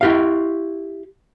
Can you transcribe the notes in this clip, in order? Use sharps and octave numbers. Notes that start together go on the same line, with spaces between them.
E4 G4 F5